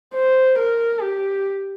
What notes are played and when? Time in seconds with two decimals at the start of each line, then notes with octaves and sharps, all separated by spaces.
0.14 C5
0.58 A#4
1.02 G4